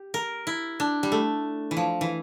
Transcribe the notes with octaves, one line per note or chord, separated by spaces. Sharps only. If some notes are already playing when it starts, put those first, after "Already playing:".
Already playing: G4
A#4
E4
D4
G3
A3
E3
F3
E3